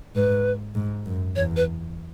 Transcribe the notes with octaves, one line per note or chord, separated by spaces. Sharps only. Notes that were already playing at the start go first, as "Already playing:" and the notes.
G#2 B4
G#2
F#2
E2 C#5
B4